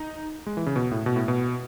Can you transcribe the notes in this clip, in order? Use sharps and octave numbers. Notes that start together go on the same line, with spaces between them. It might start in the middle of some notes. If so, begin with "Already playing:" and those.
Already playing: D#4
G#3
E3
C#3
B2
A2
B2
A2
B2